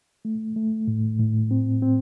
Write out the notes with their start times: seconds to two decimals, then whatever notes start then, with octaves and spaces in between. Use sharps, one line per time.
0.25 A3
0.56 A3
0.88 A2
1.19 A2
1.51 C4
1.82 C4